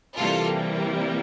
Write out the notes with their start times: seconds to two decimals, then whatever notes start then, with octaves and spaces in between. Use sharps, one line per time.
0.17 C3 E3 G3 A#3 F4 A4